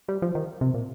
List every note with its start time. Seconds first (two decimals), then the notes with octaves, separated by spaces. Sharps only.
0.08 G3
0.22 F3
0.35 D#3
0.61 C3
0.74 A#2